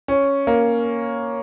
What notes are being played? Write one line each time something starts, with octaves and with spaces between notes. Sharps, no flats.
C#4
A#3